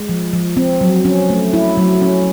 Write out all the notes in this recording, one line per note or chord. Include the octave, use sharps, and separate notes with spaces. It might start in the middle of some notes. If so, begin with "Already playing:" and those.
Already playing: G#3
F3
F3
C4
F#3
C#4
A3
E4
F#3
C#4